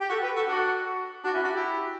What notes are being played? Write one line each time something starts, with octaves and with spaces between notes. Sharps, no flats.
G4
F#4 A4
G4 B4
F#4 A4
D4 F#4
D4 F#4
C#4 E4
D4 F#4
E4 G4